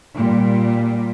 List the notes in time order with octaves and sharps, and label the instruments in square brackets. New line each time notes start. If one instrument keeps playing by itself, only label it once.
[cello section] A#2 G3